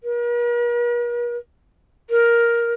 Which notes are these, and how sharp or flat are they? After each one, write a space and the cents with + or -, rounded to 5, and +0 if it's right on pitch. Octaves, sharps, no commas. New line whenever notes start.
A#4 +45
A#4 +10